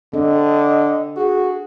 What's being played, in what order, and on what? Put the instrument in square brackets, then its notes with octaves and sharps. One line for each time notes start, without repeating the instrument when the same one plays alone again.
[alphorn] D3 [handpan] C4 D4 A4 [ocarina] D#5
[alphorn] F#4 [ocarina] G#4